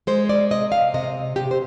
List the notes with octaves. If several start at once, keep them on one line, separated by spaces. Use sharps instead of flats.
G#3 C5
D5
C3 D#5
F5
C3 D#5
C3 G4
C5